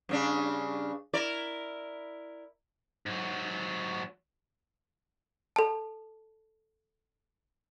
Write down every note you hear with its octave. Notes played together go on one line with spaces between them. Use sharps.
G2 C#3 D4
E4 A#4 D5
G#2 F#3
A4 A5